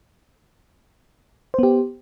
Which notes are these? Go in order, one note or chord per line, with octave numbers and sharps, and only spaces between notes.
B3 G4 C5